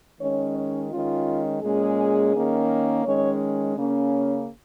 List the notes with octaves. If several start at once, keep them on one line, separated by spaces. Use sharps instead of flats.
D#3 G#3 C#4 C#5
C#5
D#3 G#3 C#4 F4
A#2 G#3 C#4 G#4
D#3 A#3 C#4
D#3 G#3 C#4 C#5
C#3 A#3 C#4